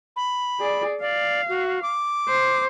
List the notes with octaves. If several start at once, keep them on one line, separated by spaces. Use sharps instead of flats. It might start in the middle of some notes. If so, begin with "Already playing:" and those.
B5
G#4 D5
D5 F5
F#4
D6
C5